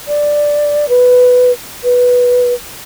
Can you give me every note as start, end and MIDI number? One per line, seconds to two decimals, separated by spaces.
0.08 0.86 74
0.89 1.51 71
1.84 2.53 71